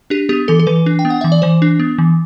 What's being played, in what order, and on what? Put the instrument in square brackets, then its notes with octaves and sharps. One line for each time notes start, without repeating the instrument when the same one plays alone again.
[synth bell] D4 G4
B3 G4
E3 A4
A4
E3 B4
D4
G5
B3
F#5
E3 E5
D5
E3 C5
D4
B3
E3